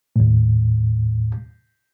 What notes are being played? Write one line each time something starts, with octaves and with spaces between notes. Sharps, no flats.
D#2 A2